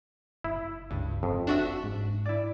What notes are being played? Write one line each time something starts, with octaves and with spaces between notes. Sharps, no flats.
F#1 E4
C#2 G2
F#1 F2
D4 F#4 E5
G#2
E4 D5